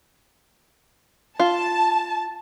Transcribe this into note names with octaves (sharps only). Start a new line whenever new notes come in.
F4 A5